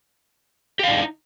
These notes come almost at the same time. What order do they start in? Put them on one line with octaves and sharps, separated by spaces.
G4 F5 D4 D#4